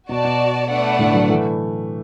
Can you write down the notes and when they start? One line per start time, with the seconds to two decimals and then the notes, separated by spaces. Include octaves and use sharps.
0.09 B2 F#4 D5 A5
0.24 B2
0.69 A3 D4 B4 D5 F#5
0.99 A2 D3
1.14 D3 F#3
1.30 E3 A3